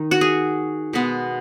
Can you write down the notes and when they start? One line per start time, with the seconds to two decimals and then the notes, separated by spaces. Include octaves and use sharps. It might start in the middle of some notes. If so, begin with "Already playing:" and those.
Already playing: D#3 D#4
0.11 F#4
0.21 G#4
0.93 B2 G#3 B3